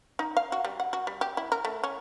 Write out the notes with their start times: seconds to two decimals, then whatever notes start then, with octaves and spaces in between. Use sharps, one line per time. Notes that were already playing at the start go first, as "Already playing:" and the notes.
0.19 D#4
0.37 F5
0.52 F#4
0.65 G3
0.80 F#5
0.93 F#4
1.07 G3
1.21 G4
1.37 E4
1.52 A#4
1.65 A3
1.84 C#4